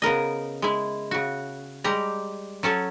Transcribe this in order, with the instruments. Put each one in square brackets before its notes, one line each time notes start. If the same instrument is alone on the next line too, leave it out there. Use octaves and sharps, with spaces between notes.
[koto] C#3 B3 A#4 D#5
G#3 E4
C#3 F#4
G3 G#3 G4 A#5
F#3 C#4 A4